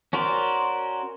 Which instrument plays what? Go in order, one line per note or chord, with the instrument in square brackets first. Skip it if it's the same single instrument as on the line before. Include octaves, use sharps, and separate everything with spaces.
[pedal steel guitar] C#4 F#4 A#4 C5 D5